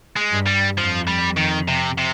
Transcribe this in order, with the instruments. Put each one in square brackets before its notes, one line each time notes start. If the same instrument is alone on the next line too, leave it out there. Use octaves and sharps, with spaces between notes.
[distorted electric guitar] G#3
[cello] G2
[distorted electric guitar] G3
[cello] F2 [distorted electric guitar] F3
[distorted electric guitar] G3
D#3
C3
C3